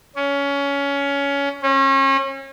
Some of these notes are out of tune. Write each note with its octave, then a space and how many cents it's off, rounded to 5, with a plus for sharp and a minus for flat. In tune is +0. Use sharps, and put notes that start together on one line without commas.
C#4 +20
C#4 -35